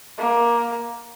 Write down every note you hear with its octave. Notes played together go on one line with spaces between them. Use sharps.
A#3